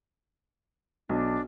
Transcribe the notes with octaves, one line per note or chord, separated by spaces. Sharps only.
B1 D4